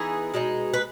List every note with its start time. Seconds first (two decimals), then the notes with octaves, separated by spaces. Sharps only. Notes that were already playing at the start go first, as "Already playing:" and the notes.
Already playing: E3 B3 D#4 G#4
0.34 B2 G#3 D#4
0.74 B4